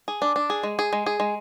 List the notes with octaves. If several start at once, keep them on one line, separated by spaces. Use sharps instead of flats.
G#4
D4
D4
G#4
G#3
G#4
G#3
G#4
G#3